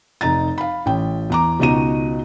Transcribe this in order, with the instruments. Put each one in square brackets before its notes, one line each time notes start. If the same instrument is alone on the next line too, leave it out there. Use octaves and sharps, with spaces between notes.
[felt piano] F1 D#4 A#5 A6
F5 B5
A1 G5
E2 A#5 D6
C#2 B2 D#4 F#4 A#5 D#7